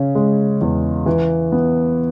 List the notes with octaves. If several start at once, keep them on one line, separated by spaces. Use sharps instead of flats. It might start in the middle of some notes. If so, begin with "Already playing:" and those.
Already playing: C#3 C#4
G#3
E2
E3
B3